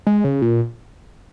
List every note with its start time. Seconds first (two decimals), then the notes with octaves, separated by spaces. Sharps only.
0.07 G#3
0.24 C#3
0.42 A#2